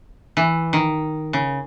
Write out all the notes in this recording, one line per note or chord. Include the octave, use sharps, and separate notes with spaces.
E3
D#3
C#3